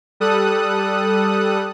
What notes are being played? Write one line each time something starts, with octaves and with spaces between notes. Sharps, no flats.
G3 A4 D#6 F#6